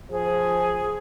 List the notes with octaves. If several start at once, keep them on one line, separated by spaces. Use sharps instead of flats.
F3 G#4